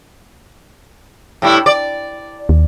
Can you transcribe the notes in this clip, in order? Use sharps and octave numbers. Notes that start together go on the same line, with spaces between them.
A2 G3 E4
D5
D#2